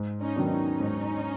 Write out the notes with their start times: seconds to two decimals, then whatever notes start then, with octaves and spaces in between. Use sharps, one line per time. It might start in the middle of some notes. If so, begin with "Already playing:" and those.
Already playing: G#2
0.21 C#4 D#4
0.36 D#3 F#3 B3 D4
0.50 C#4 D#4
0.80 G#2